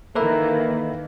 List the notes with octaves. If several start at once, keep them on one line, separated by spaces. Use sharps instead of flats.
D#3 E3 A#3 A4 B4 E5